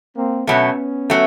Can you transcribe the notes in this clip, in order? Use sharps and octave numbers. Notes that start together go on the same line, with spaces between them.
A#3 C4
B2 F#3 A3 B3 C#4
F#3 A3